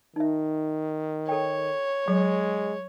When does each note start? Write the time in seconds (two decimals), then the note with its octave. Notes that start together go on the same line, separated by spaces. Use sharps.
0.16 D#3 D#4 E5
1.29 A4 C#5 G5
2.08 F#3 G#3